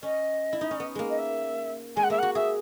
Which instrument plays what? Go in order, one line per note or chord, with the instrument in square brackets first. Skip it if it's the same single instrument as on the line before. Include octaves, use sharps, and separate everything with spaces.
[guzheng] C#4 [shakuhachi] D#5
[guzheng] E4
D#4
C#4
B3
G#3 A#3
[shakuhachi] D#5
E5
[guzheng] G#3 [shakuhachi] G#5
[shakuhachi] F#5
[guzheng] A#3 [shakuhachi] E5
[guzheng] F#4 [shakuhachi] F#5
[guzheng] G#4 [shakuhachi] E5